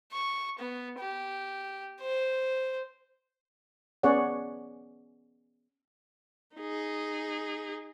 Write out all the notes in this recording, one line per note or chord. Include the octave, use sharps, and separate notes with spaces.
C#6
B3
G4
C5
B3 C#4 G#4 C#5 D5 F#5
D#4 G#4